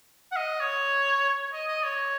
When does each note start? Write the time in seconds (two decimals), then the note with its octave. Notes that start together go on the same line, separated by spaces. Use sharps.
0.32 F#5
0.36 D#5
0.60 C#5
1.53 D#5
1.68 D#5
1.84 C#5